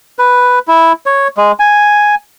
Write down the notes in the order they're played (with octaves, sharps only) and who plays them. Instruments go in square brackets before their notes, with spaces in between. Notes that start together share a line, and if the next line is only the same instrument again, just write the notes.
[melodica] B4
E4
C#5
G#3
G#5